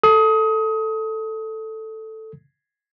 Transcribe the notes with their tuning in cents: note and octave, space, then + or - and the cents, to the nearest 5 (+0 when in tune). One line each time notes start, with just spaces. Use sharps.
A4 +0 D#6 +25